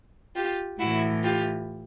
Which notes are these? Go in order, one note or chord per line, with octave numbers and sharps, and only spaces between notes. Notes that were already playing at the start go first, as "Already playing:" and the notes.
F4 G4
A2 E3 E4 F#4
F4 G4